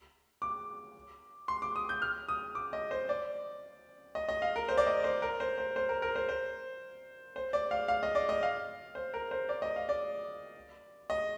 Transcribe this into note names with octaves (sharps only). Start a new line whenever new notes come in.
D6
C6
D6
D#6
G6
F6
D#6
D6
D#5
C5
D5
D#5
D#5
F5
A#4
C5
D5
D#5
C5
A#4
C5
C5
C5
A#4
A#4
C5
C5
C5
D5
F5
F5
D#5
D5
D#5
F5
C5
A#4
C5
D5
D#5
F5
D5
D#5